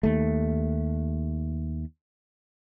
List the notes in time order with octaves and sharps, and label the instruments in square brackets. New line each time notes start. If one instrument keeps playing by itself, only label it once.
[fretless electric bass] D#2 A3